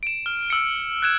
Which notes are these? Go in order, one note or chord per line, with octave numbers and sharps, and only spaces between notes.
D7 E7
F6
E6 C#7
F#6 G#6 E7